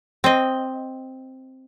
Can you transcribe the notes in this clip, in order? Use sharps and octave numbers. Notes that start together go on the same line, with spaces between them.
C4 D#5